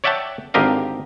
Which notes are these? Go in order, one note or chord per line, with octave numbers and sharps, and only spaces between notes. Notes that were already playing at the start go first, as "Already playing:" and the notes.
C#5 D5 E5 F#5 G5 A5
G#1 D3 G4 A#4 D#5 F5